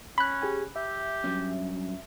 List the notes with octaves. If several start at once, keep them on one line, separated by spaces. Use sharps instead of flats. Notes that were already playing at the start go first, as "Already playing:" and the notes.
C#4 B5 F#6
G4 G#4 G#5
G4 E5
G2 F#3 C#4